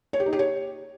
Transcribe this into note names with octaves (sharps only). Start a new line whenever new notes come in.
C#5
G4
D#4
G4
C#5